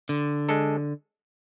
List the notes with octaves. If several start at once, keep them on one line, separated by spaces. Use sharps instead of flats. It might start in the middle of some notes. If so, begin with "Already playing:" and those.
D3
G#3 D4 A4